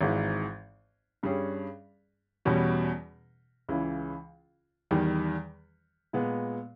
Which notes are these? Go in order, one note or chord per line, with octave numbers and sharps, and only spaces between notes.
G#1 G#2 E3
G2 G3 C#4 G#4
E2 B2 G3 C#4
C#2 C#3 E3
E2 D#3 G3
A#2 G#3 B3